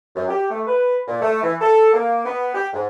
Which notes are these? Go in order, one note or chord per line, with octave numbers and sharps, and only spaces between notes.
F#2
G4
A3
B4
A#2
A3
E3
A4
A#3
B3
G4
G#2